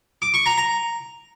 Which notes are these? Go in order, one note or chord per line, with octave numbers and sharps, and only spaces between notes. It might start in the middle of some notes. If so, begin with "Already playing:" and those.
D6
C#6
A#5
A#5